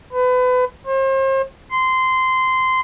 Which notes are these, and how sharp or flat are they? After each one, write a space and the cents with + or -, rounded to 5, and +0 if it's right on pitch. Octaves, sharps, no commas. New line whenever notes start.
B4 +30
C5 +40
C6 -15